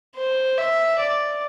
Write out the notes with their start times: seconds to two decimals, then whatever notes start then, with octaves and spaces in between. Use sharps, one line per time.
0.16 C5
0.58 E5
0.99 D5